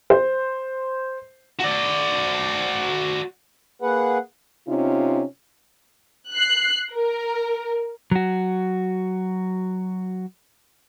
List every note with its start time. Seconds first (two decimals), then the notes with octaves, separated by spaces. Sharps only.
0.10 C5
1.60 F#4 D5
3.82 A#3 G#4 B4 F#5
4.68 C3 C#4 D#4 F4
6.32 F#6 C7
6.92 A#4
8.11 F#3 F#4